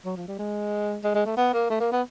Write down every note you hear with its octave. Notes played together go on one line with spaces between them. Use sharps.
F#3
F3
G3
G#3
G#3
G#3
A3
B3
A#3
A3
A#3
B3